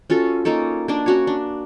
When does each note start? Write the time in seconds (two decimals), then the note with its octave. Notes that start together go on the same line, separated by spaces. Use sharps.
0.10 C#4 F4 F#4 A4
0.45 A#3 C#4 D#4 A4
0.88 A#3 D4
1.06 C#4 F#4 C#5
1.27 D4